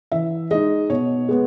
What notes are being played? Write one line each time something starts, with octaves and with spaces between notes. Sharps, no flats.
E3 E5
G#3 D#4 D#5
B2 C#5
G#3 B3